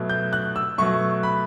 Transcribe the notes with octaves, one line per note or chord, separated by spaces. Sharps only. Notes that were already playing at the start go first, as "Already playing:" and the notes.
Already playing: B2 F#3 A3
G6
F#6
E6
B2 F#3 A3 C#6
B5